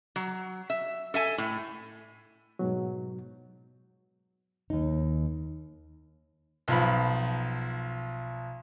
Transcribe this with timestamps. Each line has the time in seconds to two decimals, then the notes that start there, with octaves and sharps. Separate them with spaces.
0.16 F#3
0.70 E5
1.14 A4 E5 G#5
1.38 A2
2.59 G#2 B2 F#3
4.70 D#2 D#4
6.68 B1 F3 B5